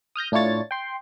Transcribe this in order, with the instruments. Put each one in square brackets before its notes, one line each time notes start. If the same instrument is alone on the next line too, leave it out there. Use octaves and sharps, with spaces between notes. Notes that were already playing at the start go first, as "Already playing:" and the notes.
[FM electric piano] D#6 F6 G6 A#6
A2 D4 E4 F4 C#5 A6
G5 C6